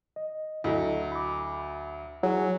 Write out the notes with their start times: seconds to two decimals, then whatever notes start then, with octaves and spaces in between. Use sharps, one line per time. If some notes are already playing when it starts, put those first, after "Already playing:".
0.16 D#5
0.64 D2 F#3 E4 A4 D#5
1.12 B5 D6
2.23 F#3 E4 G#4 G#5